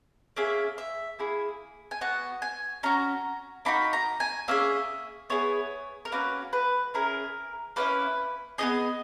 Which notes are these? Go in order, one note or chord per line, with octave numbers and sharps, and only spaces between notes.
A#3 C#4 G#4 E5
E5
A#3 E4 G#4
G#5
B3 F#4 F#5
G#5
C#4 F#4 A#5
A#3 D#4 F#4 B5
A#5
G#5
A#3 C#4 G#4 E5
B3 E4 G#4 C#5
A#4
A#3 C#4 F#4 B4
B4
C#4 E4 G#4 A#4
A#3 C#4 E4 B4
B3 D#4 G#4 D#5